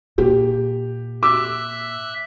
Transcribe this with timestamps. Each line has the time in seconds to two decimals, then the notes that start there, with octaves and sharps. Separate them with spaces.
0.18 A#2 G4
1.23 E5 D6 E6 F#6